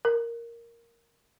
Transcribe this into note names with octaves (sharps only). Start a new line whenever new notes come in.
A#4